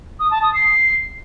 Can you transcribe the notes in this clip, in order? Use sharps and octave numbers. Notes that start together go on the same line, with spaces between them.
D#6
A5
D#6
C7